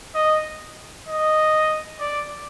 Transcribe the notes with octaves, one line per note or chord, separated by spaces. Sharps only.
D#5
D#5
D5